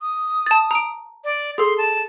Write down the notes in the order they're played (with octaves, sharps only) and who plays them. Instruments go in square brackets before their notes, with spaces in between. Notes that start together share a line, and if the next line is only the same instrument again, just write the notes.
[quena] D#6
[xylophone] A5 A6
A#5 D7
[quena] D5
[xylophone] G#4 A4 [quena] C6
[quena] A5